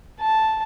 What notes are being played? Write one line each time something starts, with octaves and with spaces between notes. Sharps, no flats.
A5